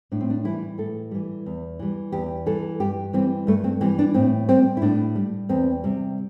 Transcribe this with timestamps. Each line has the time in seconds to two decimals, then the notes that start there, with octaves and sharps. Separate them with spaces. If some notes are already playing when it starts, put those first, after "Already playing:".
0.12 A2 D4
0.21 C4
0.30 D4
0.44 E3 G3 E4
0.78 A2 A4
1.11 E3 G3
1.46 E2
1.79 E3 G3
2.12 E2 G4
2.46 E3 G3 A4
2.80 G2 G4
3.13 E3 G3 C4
3.47 G2 A3
3.64 C4
3.81 E3 G3 C4
3.99 D4
4.14 A2 C4
4.49 G3 C4
4.77 E4
4.82 A2 D4
5.15 G3
5.49 E2 C4
5.84 C3 G3